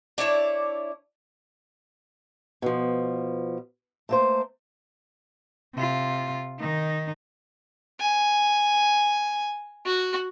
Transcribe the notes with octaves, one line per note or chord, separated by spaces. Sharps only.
D4 E4 C#5 D5
B2 F3
A3 A#3 C5
C3 F4
D#3 D#4
G#5
F#4